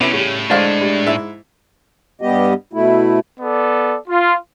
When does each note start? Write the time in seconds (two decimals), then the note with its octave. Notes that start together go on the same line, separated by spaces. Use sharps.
0.01 C3 B3 C#4 E4
0.13 A2 C#3 G3
0.50 D3 G#3 D4 C5 F5
0.81 G3
1.06 G#2 E4 E5
2.22 G2 G3 B3 G4 D#5
2.73 B2 A3 E4
3.40 B3 A4 D5
4.09 F4